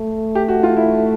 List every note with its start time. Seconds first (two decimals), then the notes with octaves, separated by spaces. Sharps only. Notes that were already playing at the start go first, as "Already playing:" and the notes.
Already playing: A3
0.35 G4
0.49 F#4
0.63 F4
0.77 E4